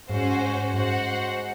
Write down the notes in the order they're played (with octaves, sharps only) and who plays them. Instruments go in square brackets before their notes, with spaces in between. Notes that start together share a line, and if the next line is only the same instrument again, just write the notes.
[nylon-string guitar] G#2 [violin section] C#4 F#4 C5
[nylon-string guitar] G#2 [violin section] F#4 C5 F#5